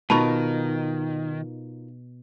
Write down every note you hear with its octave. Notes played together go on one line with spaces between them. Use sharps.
B2 D#3 D#4 F4 A#4 A5 B5 C#6